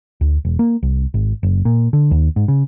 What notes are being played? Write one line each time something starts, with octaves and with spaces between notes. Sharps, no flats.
D2
E1
A#3
C2
G#1
F#1
A#2
D3
D#2
G#2
C#3